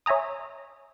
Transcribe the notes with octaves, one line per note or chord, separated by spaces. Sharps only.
C#5 E5 G#5 A#5 D#6